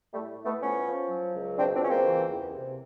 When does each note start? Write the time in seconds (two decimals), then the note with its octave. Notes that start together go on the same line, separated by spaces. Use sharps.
0.13 A2 G3 A3
0.37 A2
0.45 A3 B3
0.61 F3 B3 C#4
0.85 F3
1.09 F#3
1.33 C#2
1.57 B2 C4 D4
1.73 C4 D4
1.81 C#2 C#4
1.89 A#3 C4
2.05 E3
2.29 E2
2.53 C3